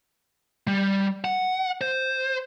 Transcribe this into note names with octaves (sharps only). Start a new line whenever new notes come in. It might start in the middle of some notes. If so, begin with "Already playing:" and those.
G3
F#5
C5